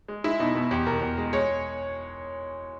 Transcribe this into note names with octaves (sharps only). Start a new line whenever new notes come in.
G#3
G#3 E4
B2 D#4
B2
E2 G4
B2 A#4
E2
G#3
G#3 C#5